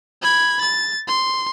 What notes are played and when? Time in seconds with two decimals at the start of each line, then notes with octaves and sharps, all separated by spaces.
0.22 B5 G#6
0.61 A6
1.08 C6